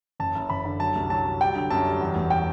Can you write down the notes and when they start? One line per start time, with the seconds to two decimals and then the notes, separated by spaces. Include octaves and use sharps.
0.20 F#1 A5
0.35 F#1
0.50 F#1 B5
0.65 D3
0.80 F#3 A5
0.95 C2
1.10 F#3 A5
1.26 F#3
1.41 G3 G5
1.56 D3
1.70 F#2 A5
1.85 G3
2.00 E2
2.16 E1
2.30 G5